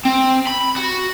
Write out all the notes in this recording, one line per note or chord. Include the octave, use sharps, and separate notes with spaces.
C4
B5
F#4